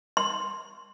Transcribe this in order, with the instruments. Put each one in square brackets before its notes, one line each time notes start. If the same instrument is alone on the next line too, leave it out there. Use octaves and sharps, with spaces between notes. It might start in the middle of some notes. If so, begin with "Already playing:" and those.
[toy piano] C6